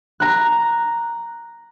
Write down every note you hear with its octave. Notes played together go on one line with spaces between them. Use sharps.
A#5 F#6